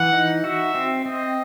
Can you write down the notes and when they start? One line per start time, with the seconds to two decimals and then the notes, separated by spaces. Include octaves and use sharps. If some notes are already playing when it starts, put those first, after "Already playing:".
Already playing: E3 F#5
0.13 D#4
0.44 F#4 E5
0.75 C4
1.05 C4 D#5